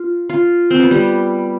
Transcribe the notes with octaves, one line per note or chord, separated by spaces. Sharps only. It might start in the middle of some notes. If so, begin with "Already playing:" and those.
Already playing: F4
F4
C4
B3
G3